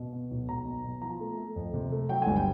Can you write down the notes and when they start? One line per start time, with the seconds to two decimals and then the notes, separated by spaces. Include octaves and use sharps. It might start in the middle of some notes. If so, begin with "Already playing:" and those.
Already playing: B2
0.12 B3
0.31 B1
0.48 B1 A#5
0.65 B2
0.84 B2
1.02 F3 A#5
1.20 A3
1.37 A3
1.56 F2
1.74 C3
1.92 A3
2.09 F#3 G5
2.22 G1 G#5
2.36 G5